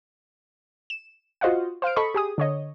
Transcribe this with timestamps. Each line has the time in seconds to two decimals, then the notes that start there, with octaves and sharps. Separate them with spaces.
0.90 E7
1.41 F4 F#4 C5 D#5 F5 F#5
1.82 C5 F5 F6 D7
1.96 A4 D#5 B5 C#6
2.15 G4 G#4 D#6
2.38 D3 C#5 D#5